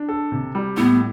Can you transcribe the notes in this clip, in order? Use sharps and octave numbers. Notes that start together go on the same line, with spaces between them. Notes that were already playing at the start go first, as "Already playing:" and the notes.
Already playing: D4
A4
C3
G3
A2 B3